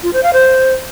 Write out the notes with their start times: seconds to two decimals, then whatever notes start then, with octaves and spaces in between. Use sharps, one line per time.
0.03 F4
0.13 C5
0.23 F5
0.33 C5